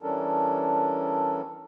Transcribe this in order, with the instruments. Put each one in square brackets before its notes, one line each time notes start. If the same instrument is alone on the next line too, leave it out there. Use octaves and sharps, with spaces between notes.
[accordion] E3 G3 C#4 D4 A4 A#4